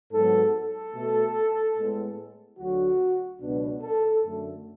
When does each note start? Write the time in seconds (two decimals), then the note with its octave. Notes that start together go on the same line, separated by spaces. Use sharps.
0.12 G#2 F#3 B3 A4
0.53 A4
0.93 B2 A3
1.76 A2 G#3 B3
2.58 D2 D3 F#3 F#4
3.40 C#2 B2 F#3 B3 D4
3.82 A4
4.23 F#2 D3 A3